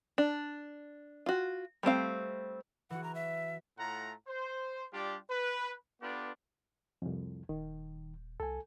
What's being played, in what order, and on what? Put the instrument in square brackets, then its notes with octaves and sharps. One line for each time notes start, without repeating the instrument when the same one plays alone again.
[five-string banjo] D4
F4 F#4
G3 A3 C4 F5
[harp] E3 F#4 [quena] F#5
[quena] A#5
E5
[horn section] A2 A3 F4 F#5 A#5
C5
G3 D4 F4 G4
B4
B3 D4 F4 G4 A4 B4
[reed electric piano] C2 F2
[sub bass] D#1 [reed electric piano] D#3
[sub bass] C2 [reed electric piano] A4 G#5